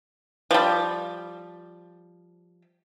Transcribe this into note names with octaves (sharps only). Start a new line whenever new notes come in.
F3 G3